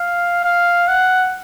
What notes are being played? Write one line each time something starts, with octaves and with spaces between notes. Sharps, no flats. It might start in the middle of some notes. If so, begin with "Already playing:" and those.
Already playing: F5
F5
F#5